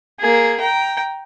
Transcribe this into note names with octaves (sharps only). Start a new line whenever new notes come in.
A#3 G#4
G5 A#5